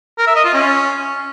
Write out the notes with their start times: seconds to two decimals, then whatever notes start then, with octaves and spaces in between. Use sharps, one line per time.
0.18 A#4
0.27 E5
0.36 D#5
0.45 F4
0.54 C#4